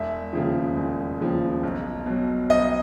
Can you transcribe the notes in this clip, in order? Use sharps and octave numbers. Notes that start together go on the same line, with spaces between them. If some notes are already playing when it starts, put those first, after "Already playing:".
Already playing: E1 E5
D#2 C#3 F3
E1
D#2 C#3 F3
B1
B2 F#3
B1 D#5